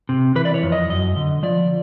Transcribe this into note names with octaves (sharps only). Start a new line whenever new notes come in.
C3
E3 B4
D5
C#5
F2
D#5
F#2 D#5
D3
F3 D5